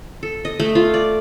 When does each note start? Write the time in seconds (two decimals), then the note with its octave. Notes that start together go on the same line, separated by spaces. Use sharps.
0.23 A4
0.45 D#5
0.60 A3
0.75 F4
0.94 D5